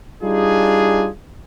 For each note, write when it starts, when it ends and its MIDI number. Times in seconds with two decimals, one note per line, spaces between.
0.22 1.07 55
0.22 1.07 62
0.22 1.07 63
0.22 1.07 65
0.22 1.07 68